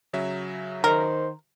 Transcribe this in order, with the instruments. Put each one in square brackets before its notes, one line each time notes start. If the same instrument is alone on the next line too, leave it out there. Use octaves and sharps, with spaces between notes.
[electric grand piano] C#3 F#3 E5
[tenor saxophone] D#3 [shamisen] A#4 [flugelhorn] C5